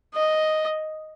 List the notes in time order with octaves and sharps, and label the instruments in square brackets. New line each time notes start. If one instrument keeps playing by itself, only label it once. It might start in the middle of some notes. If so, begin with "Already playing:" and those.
[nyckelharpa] D#5